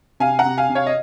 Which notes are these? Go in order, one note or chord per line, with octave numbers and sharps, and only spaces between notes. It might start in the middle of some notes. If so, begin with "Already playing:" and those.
C3 F5 G#5
F#5 A#5
C3
F5 G#5
C3
C#5 F5
D#5